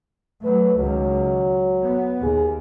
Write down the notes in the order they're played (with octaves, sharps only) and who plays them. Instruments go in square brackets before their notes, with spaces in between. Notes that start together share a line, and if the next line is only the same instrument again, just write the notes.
[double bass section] F#3 A3 [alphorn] B4
[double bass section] C#2 D#3 [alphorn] F#3
[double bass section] B3
[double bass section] D#2 [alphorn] G#4